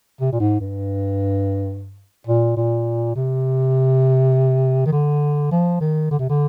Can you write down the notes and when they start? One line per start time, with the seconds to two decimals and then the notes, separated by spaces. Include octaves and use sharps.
0.21 C3
0.33 A#2
0.40 G#2
0.60 G2
2.27 A#2
2.57 A#2
3.16 C3
4.86 D#3
4.93 D3
5.52 F3
5.81 D#3
6.11 D3
6.19 C3
6.30 D3